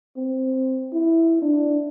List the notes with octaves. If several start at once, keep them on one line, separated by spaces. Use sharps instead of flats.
C4
E4
D4